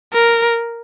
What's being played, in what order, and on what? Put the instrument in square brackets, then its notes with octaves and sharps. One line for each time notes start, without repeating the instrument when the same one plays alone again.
[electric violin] A#4